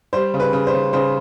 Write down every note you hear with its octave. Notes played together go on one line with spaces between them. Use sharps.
G3 C5
C#3
B4
C#3
C5
C#3
C#3 C5